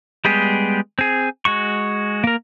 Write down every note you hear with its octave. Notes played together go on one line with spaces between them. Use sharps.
G3 G#3 B3 G4 G#4
C4 G#4
G#3 F#4 C#6
A#3 A#4